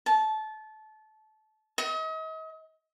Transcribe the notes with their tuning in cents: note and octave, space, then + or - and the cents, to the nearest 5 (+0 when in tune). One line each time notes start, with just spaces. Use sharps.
A5 -25
D#5 +40